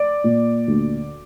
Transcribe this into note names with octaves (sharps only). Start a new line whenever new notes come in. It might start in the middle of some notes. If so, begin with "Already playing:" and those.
Already playing: D5
A#2
D2